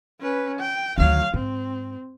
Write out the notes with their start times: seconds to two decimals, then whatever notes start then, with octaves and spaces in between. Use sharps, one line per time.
0.20 C#4 B4
0.59 G5
0.98 D2 D#3 F#3 F5
1.34 G#2 C4